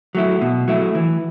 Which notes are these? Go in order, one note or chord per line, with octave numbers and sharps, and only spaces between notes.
F#3 A3 E4
B2
F#3 A3 E4
E3